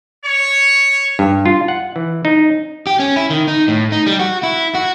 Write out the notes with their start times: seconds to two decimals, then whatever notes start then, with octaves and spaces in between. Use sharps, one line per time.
0.24 C#5
1.19 G2
1.46 F4
1.68 F#5
1.96 E3
2.25 D#4
2.87 G4
2.99 C#4
3.16 E4
3.31 D#3
3.48 D#4
3.68 A2
3.92 D#4
4.06 G3
4.19 F#4
4.43 E4
4.75 F#4